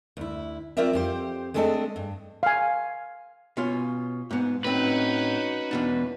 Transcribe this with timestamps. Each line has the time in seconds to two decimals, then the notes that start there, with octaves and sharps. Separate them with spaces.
0.17 D2 E4
0.77 F#3 C4 F4 A#4 D5 E5
0.93 F2 G4 C5
1.54 G#3 A3 C4 D4 A4 D#5
1.96 G2
2.43 F5 G#5
3.57 B2 C#4 F4
4.31 G#2 B3
4.64 A2 C4 C#4 D#4 F#4 B4
5.71 E2 B2 D4